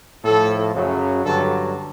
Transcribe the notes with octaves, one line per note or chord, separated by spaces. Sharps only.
A2 F3 A4
F#2 C#3 F#3
G2 D3 F#3 A4